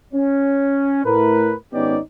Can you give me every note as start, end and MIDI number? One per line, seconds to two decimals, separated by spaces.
0.13 1.04 61
1.04 1.53 45
1.04 1.53 70
1.04 1.53 71
1.73 1.98 32
1.73 1.98 59
1.73 1.98 61
1.73 1.98 63
1.73 1.98 67
1.73 1.98 74